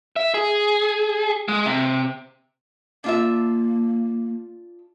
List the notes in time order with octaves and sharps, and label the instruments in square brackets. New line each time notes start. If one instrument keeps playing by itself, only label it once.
[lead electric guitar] E5
G#4
G#3
C3
[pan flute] A#3 [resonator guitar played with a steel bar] D4 F4 E5